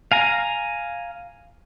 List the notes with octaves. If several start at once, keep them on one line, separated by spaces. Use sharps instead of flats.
F5 G#5 A#5